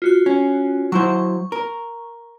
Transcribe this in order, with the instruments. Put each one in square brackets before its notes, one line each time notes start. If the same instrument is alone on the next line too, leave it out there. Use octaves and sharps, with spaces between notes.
[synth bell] F4 F#4 F#6
[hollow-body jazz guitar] C#4
[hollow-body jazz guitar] F#3 E4 C5 [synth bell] C#6
[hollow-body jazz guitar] A#4